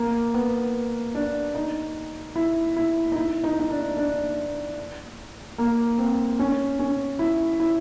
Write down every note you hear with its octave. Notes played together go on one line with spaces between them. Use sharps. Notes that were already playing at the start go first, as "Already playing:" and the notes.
Already playing: A#3
B3
D4
D#4
E4
E4
D#4
E4
D#4
D#4
D4
D4
A#3
C4
C#4
C#4
E4
E4